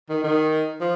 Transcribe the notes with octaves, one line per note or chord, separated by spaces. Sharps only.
D#3
D#3
F3